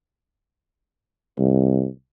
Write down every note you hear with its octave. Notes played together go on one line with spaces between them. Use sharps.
C2